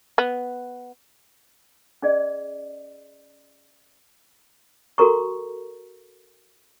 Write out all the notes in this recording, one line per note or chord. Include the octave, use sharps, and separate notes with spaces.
B3
C#4 G#4 D5 D#5
F#4 A4 A#4 A#5 C#6